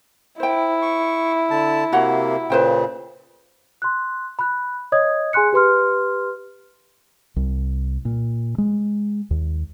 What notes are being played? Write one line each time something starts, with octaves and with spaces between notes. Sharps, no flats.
E4 C5 G5
C#6
D3 A5
C3 A#3 F#4 C#5 F#5
A#2 C#3 B4 C5 G5
C6 F#6
B5 F#6
C#5 D#5 D#6 G#6
G#4 G#5 C6 F#6 C#7
G4 B4 C6 F6
C2
A#2
G#3
D#2